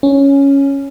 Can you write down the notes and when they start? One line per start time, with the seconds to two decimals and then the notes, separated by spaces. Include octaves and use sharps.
0.03 C#4